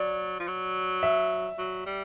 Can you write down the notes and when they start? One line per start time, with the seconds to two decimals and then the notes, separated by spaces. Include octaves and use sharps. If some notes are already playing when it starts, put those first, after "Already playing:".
Already playing: F#3 D5
0.40 F3
0.48 F#3
1.03 E5
1.59 F#3
1.86 G3